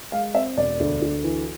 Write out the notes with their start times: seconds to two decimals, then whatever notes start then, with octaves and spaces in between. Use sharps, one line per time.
0.12 G#3 F5
0.35 C4 E5
0.57 E1 D5
0.80 D2
1.02 D2
1.24 E3